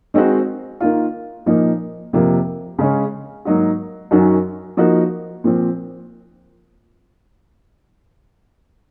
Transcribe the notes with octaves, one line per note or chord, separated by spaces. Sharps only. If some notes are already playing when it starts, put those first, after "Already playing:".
D#3 G#3 C4 D#4 F#4
D#3 A#3 F4
A#2 F3 A#3 D#4
F2 C3 F3 A#3
C#3 G#3 C#4
G#2 F#3 A#3 D#4 F#4
F#2 D#3 F#3 C#4 F#4
F3 A#3 D#4 F#4
A#2 F3 C4